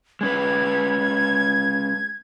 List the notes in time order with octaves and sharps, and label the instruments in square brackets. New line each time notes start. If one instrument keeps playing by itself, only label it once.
[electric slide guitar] G#3 C#4 B4 [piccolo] G#6